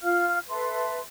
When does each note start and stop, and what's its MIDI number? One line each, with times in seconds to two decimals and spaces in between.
0.02 0.39 65
0.02 0.39 77
0.02 0.39 89
0.49 1.01 69
0.49 1.01 71
0.49 1.01 76
0.49 1.01 84